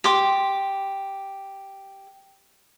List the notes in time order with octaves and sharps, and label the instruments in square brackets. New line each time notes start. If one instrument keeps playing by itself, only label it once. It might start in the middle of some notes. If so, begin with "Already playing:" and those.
[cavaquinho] G4 C6 D6